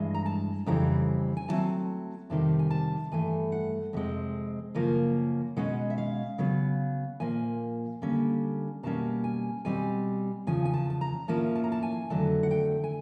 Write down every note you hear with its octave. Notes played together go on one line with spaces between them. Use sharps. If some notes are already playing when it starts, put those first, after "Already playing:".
Already playing: G2 E3 G#3
A#5
A5
F2 C#3 E3 G3 C4 A#5
G#5
A2 F#3 A3 C4 A5
F2 C3 D#3 G3 A5
G#5
A5
G2 E3 A3 G#5
F#5
F2 C3 G#3 C4
F#2 C#3 F3 A#3 C#4
B2 G#3 C#4 F#5
E5
F5
C#3 F#3 B3
A#2 F3 A#3 G#5
D3 G3 A#3 C#4
B2 G3 A#3 C#4 A5
G#5
B2 G3 C4 G#5
E2 C#3 F3 G#5
G#5
A5
A5
A#5
A2 F3 A#3 C#4 A5
A5
A#5
A5
G#5
F2 D3 F#3 A3 A5
F#5
G5
G#5